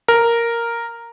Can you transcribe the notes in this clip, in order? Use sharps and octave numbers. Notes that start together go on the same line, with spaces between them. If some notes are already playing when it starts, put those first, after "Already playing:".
A#4